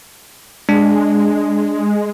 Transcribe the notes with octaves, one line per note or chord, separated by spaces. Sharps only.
G#3 D4